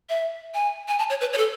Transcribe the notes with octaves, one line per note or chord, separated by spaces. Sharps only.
E5
G#5
G#5
A5
C#5
B4
C#5
A4